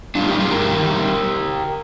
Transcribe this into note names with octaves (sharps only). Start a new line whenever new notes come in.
G3 D4 F4
D#4 G4
G3
F4 G#4
G2 G4 A#4
D#3
G3